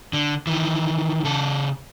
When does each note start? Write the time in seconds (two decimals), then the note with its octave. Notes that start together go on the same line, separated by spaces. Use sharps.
0.13 D3
0.47 D#3 E3
1.24 C#3 A4